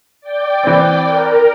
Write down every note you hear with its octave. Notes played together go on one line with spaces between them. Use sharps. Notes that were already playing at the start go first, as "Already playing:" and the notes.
D5 G5
E3 C4
A#4